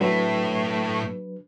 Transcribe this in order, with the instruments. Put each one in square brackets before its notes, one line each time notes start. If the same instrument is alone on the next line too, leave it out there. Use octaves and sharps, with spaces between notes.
[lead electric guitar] A2 A3 [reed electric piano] F#3 D4 B4